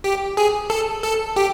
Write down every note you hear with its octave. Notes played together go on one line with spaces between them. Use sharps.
G4
G#4
A4
A4
G4